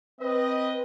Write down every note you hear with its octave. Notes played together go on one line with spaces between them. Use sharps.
C4 B4 D#5